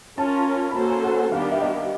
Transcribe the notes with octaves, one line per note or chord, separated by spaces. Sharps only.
C#4 F4 A#4 A5
B5
A#3 C#4 F#4 A4 C5 A#5
G#5
F#5
D#3 G3 B3 D4 G4 F5
E5
D#5